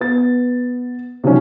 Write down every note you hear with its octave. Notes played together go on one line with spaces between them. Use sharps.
B3 A6
C3 D#3 F3 F#3 C#4